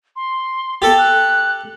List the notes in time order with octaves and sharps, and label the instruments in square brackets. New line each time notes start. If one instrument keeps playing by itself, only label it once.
[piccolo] C6
[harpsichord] G4 A4 [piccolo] A6
[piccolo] F#6